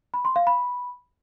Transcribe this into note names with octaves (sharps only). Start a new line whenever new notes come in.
B5
C6
F5
B5